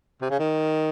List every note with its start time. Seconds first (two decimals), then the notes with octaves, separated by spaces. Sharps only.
0.22 C3
0.30 C#3
0.39 D#3